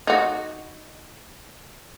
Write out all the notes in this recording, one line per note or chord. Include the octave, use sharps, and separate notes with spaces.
D#4 F#4